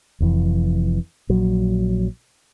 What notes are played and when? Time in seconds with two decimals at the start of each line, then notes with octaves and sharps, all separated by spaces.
0.20 F1 F2 E3
1.29 A#1 F#3